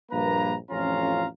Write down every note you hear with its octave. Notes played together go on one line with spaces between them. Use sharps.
A#1 G2 A#3 B4 A#5
A1 F2 C#4 F4 F5 A#5